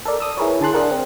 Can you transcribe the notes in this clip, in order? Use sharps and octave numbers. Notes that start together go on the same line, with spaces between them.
A4 A#4 D5
D#6 E6
E4 G#4 A#4 B4 C#5
D3 G#4 A5 C6 F#6
D4 G#4 A#4 F#5
C4